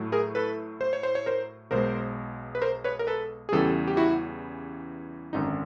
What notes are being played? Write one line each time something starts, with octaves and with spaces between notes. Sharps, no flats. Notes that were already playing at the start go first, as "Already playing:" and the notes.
Already playing: A2 F#3 A3
G#4 A#4
A4 B4
C5
C#5
C5
C#5
A#4 C5
B1 B2 G#3 A#4 C5
B4
A#4 C5
B4 C#5
A#4
A4 B4
G#4
E2 C#3 E3 G3 G4 A4
G4
E4 F#4
G#1 F#2 D3 D#4